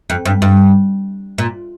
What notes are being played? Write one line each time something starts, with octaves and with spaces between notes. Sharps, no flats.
F2
G2
G2
A#2